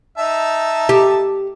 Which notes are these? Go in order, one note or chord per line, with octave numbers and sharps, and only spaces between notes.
D#4 E5 A5
G4